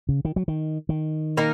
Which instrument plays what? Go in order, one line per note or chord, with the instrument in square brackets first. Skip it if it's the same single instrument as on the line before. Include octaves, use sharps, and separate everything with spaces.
[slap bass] C#3
D#3
F#3
D#3
D#3
[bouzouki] A#3 D#4 A#4